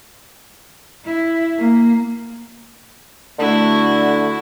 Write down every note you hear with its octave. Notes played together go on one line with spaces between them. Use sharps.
E4
A#3
D3 A3 E4 F#4